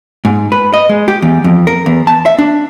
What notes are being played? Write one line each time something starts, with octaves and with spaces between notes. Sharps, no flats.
G#2
B4
D#5
G#3
G4
E2
F2
A#4
E2
A5
E5
D4